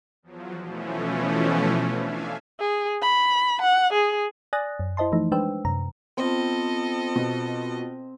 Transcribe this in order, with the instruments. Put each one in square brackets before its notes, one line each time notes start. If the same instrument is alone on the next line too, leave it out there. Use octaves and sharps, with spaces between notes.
[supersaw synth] E2 F3 F#3
B2 E3 F3 A3 C#4
D4 E5 F5 G#5
[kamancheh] G#4
B5
F#5
G#4
[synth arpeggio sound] D5 G#5 D#6 F#6 A6 A#6
F#2
E4 C5 D#5 A5 C6
E3 F3 A3 D#4
G#3 D4 B4 C5 G5 E6
F#2 C3 A#5
[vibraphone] B3 F4 [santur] C4 [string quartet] A4 D#5
[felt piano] B2